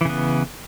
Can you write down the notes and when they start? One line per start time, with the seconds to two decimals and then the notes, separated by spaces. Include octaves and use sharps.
0.01 E3
0.05 C#3
0.09 B3